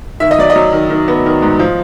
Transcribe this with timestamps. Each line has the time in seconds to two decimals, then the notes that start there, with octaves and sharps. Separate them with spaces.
0.20 D#3 E5
0.31 D#5
0.39 F#3 D5
0.50 D#5
0.56 F#3
0.73 D#3
0.90 D#3
1.08 B3
1.26 D#3
1.42 G#2
1.59 F3